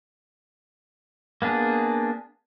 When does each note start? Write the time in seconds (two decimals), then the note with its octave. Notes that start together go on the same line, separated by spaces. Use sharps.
1.42 A#3 B3 D4 G#4